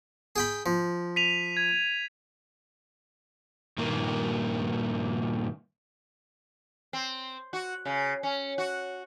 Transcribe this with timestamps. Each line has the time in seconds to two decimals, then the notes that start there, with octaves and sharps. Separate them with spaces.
0.36 G#4 G5 B5
0.66 F3
1.16 B6 D#7 F7
1.57 G#6
3.78 G2 A#2 D#3 A#3
6.93 C4
7.53 F#4
7.85 C#3
8.23 C#4
8.58 F#4